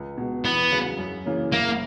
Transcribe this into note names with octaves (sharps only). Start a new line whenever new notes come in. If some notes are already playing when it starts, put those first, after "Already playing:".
Already playing: C#2
B2 G#3
E2 B3
C#3 F#3
F#2
C#3 E3 A#3 C#4
F#1 A#3